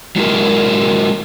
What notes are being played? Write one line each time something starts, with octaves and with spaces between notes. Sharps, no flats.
F#3 G#3 E4 F#4 A#4